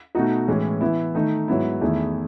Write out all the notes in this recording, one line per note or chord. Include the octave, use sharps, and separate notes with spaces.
B2 A3 D#4 F#4
A2 E3 G#3 C#4
E3 B3 E4
D#3 A3 D#4
G#2 F#3 B3 E4
E2 D#3 A3 E4 G#4